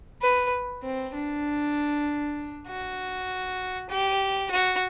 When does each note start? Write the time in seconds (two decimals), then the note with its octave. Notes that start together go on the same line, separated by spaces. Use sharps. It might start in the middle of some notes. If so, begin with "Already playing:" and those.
0.22 B4
0.83 C4
1.14 D4
2.67 F#4
3.89 G4
4.51 F#4